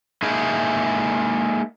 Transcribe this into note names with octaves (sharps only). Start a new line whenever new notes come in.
G#3 A#3 D#4 E4 G#4